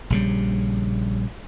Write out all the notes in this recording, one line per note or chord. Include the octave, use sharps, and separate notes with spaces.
A#1 C#3 G3